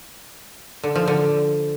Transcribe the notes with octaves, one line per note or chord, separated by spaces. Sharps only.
D3
F3
D3